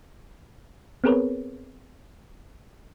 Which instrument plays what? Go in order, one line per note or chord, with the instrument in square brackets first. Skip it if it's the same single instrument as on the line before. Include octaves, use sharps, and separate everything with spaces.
[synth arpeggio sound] B3 C4 G#4 A#4 B4 C#5